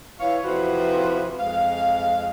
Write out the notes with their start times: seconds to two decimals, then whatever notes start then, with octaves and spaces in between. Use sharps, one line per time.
0.20 E3 C#5 F5
0.44 F2 C3 E3 F3 F#4 B4
1.39 F2 G#3 F5